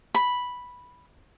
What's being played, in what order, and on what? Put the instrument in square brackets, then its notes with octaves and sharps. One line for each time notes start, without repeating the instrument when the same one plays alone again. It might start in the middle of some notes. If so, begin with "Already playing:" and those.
[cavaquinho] B5